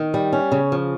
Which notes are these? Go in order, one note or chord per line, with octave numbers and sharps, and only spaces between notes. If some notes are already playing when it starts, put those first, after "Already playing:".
Already playing: D#3
G3
C#4
C#3
F3